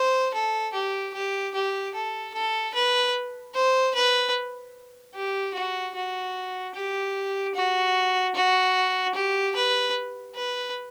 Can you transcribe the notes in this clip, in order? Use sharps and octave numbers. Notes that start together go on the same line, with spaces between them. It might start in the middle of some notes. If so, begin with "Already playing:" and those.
Already playing: C5
A4
G4
G4
G4
A4
A4
B4
C5
B4
G4
F#4
F#4
G4
F#4
F#4
G4
B4
B4